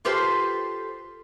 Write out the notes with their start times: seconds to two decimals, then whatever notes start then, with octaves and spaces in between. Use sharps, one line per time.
0.05 F4 G4 A4 B4 C5 G5